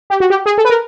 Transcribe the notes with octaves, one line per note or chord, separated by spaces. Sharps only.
G4
F#4
G4
G#4
A4
B4
A#4